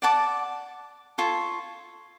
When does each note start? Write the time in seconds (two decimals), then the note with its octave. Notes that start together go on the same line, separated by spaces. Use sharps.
0.02 D5 F#5 A5 D6
1.18 F4 A4 C#5